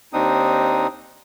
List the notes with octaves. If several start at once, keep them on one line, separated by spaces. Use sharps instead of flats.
D#2 C4 D4 D#4 D#6